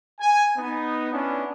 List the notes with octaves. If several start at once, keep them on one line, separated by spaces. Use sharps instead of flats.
G#5
B3 D#4
B3 C#4 D4 E4